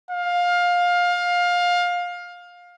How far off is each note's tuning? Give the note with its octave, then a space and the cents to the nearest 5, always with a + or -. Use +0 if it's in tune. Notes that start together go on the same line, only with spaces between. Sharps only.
F5 +20